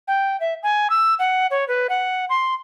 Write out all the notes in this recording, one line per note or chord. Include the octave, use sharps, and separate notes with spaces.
G5
E5
G#5
E6
F#5
C#5
B4
F#5
C6